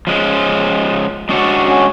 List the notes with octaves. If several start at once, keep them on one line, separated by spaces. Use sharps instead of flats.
F3 G#3 C#4
G#3 D4 F#4 C#5
C#4 F#4